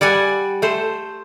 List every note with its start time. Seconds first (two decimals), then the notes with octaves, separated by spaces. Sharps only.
0.01 G3 D5 F#5 G#5
0.62 A3 C5